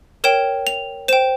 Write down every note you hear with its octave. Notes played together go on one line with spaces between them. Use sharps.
A#4 C#5 G5 E7
F7
C5 G5 E7